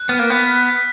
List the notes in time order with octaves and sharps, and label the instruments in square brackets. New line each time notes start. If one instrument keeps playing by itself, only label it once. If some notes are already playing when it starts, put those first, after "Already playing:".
Already playing: [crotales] F#6
[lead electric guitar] B3 [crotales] F6
[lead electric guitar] A#3
[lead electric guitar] B3 [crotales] B6
[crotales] F6
B6